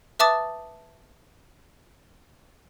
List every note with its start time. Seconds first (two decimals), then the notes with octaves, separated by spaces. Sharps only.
0.19 B4 E5 A5 D6 D#6 A6